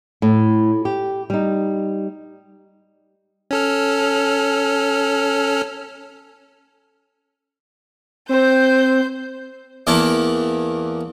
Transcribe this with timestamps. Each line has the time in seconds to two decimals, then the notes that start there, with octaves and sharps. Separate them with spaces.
0.22 A2
0.85 G4
1.30 G3 D#4
3.51 C#4 A4 F6
8.29 C4 C5 G6
9.87 E2 E3 A#3 E4 A5